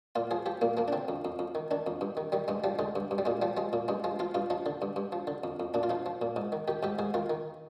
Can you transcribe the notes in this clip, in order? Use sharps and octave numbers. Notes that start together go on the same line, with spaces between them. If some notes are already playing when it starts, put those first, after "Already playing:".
A#2 F4
F3 G#4
F3 G4
A#2 A#3
F3 A#3
D4
D3 C4
F2
F2
F2
D#3
D#3 D4
F2
G2
D#3
D#3 G3
G2 G#3
F3 G3
D3 G#3
G2
G2
G3
A#2 G#3
F3 G3
F3 G#3
A#2
G2 G#3
F3 G#3
F3 F4
G2 F4
F3 D#4
D3
G2
G2
F3
D3
F2
F2
A#2 D4
F4
F3 D#4
F3
A#2
G#2
D#3
D#3 G4
G#2 G4
G#2 G#4
D#3 F4
D#3